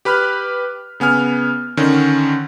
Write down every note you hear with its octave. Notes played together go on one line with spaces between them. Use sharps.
G4 B4 B5 F6 F#6
C#3 B3 G#5 F6
D3 D#3 C#4